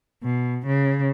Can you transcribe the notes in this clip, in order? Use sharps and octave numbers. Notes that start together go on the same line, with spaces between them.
B2
C#3